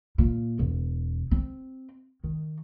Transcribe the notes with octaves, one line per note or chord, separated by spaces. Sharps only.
A#2
E1
C4
D#3